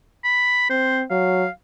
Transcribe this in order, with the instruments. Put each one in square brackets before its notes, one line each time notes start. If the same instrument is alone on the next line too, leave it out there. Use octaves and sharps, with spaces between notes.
[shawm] B5
[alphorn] C4 [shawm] C5
[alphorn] F#3 [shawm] F5